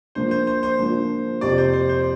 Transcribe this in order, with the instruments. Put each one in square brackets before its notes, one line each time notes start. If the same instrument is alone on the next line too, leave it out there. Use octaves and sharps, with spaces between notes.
[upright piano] F3 A#3 D4 [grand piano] C5
[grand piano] C5
C5
C5
[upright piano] F3 A#3 D4
[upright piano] F2 C3 F3 C4 [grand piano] D5
[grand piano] C5
C5
C5